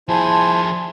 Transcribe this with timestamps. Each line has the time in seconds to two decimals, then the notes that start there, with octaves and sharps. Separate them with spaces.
0.09 F3 E4 G#4 C5 G#5 A5